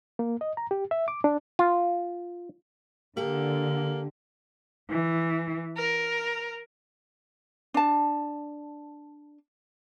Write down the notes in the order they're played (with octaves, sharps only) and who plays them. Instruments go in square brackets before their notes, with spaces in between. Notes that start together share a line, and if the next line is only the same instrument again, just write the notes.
[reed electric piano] A#3
D#5
A#5
G4
E5
D6
D4
[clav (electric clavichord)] F4
[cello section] D3 [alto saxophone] A#3 [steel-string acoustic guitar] G4 A4
[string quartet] E3
A#4
[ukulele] D4 A5